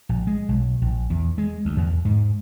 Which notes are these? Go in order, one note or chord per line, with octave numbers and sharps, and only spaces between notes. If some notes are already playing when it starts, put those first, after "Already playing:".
A#1
G#3
B1
A#1
E2
G#3
D2
E2
G#2